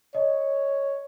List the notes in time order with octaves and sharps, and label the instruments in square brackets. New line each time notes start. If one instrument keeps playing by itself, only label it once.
[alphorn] C#5 [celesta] D#5